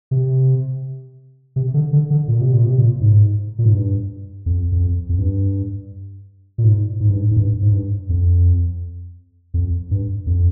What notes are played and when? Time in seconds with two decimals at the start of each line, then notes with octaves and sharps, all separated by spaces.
0.11 C3
1.56 C3
1.74 D3
1.93 D3
2.10 D3
2.28 A#2
2.41 C3
2.53 A#2
2.65 C3
2.78 A#2
3.01 G#2
3.59 A#2
3.65 G#2
3.73 G2
4.46 F2
4.72 F2
5.09 F2
5.19 G2
6.58 A#2
6.64 G#2
7.00 G#2
7.10 G2
7.19 G#2
7.31 G#2
7.37 G2
7.62 G#2
7.72 G2
8.09 F2
9.54 F2
9.91 G2
10.26 F2